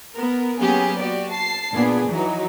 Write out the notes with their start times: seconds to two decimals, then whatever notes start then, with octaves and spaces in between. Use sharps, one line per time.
0.14 B3 A#4
0.59 F#3 A#3 B3 C#4 G4 G#4
0.98 F#4 G4 D5
1.32 A5 C7
1.73 A#2 B3 D4 G#4
2.10 E3 F#3 D#4